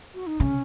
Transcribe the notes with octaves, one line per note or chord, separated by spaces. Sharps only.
F#4
D#4
C#3 C#4